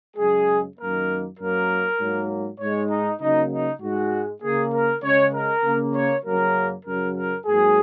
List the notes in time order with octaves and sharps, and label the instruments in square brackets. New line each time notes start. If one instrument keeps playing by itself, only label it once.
[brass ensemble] F#2 C#3 G#3 G#4
F#2 D#3 A#3 A#4
F#2 F#3 A#3 A#4
G#2 F#3 A#3
G#2 G#3 C#5
D#4
C#3 F#3 A#3 D#4
D#4
G#2 G#3 F#4
C#3 A#3 G#4
A#4
C#3 G#3 C#5
A#4
C#3 A#3
C#5
F#2 C#3 F#3 A#3 A#4
F#2 C#3 F#3 A#4
A#4
G#2 F#3 A#3 G#4